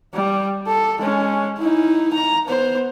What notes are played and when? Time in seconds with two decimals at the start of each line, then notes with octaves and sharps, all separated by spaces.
0.14 G3
0.67 A4
0.99 G#3 C#4
1.58 D#4 E4
2.13 A#5
2.46 B3 C5